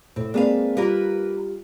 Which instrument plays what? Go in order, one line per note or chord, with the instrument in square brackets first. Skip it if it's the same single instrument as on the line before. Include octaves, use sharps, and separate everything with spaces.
[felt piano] A2 [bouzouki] C4
[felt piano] G#3 A#3 C4 [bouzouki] D4 B4 F5
[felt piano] G3 F4 [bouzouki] A#3 A#4 B4